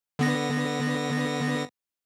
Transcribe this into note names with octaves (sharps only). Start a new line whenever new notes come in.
D3 B3 A#6